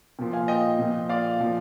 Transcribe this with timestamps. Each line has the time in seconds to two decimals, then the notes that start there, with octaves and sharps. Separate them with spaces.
0.19 A#2 F3
0.33 F5 G#5
0.48 D#5 G5
0.78 A#2 F3
1.09 D5 F5
1.40 A#2 F3